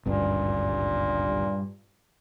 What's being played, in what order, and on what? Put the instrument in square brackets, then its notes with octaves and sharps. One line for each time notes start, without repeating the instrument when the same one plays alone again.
[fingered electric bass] G#1 D2 C#4 [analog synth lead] G2 [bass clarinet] A#2